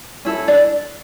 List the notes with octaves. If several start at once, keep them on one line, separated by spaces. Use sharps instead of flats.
C#4 E4 A4
D4 D5